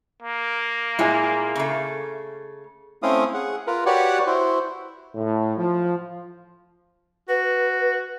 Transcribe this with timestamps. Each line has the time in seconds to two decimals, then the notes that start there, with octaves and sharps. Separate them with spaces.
0.23 A#3
0.99 A#2 G#3 E4 G#5
1.56 C#3 A3
3.03 A3 C4 C#4 E4 F5 D#6
3.34 G#4 F#5
3.67 F4 A#4 B4
3.86 F#4 G4 B4 C#5 D5 F#5
4.27 E4 F#4 C5
5.15 A2
5.56 F3
7.29 F#4 B4